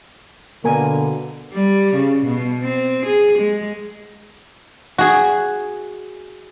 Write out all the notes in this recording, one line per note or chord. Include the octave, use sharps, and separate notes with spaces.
B2 D3 A#3 A#4 G#5
G3
C#3
B2
C4
G#4
G#3
F#4 G#4